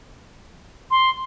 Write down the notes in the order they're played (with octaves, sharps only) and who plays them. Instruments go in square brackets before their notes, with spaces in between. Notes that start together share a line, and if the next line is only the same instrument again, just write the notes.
[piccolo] C6